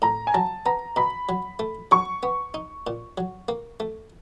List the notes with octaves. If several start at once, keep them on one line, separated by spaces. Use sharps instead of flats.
A2 A#5
G#5
F#3 A5
B3 A#5
B2 B5
F#3
A3
F#3 C#6
B3
D#4
A#2
F#3
A#3
A3